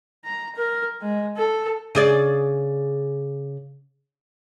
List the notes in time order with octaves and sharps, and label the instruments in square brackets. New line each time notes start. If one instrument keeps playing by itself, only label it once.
[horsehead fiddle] A#5
A#4
G#3
A4
[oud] C#3 G#4 D5